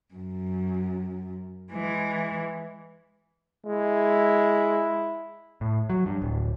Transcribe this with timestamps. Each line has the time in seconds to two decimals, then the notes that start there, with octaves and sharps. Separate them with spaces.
0.14 F#2
1.72 E3 G#3
3.66 G#3 E4
5.61 A2
5.90 F#3
6.06 G2
6.22 D1